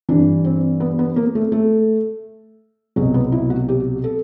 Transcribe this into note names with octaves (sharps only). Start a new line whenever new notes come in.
G2 E3 D4
C4
B3
B3
A#3
A3
A3
C2 B2 F#3 G#3
B3
E4
F#4
G4
A4